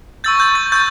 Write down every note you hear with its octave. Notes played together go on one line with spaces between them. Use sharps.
C#6 E6 G6 A6
G6
A6
C#6 E6 G6